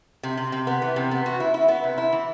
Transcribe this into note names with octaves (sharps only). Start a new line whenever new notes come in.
C3
C3
C3
B3
E3
C3
B3
F#4
E4
E4
B3
C3
E4
E3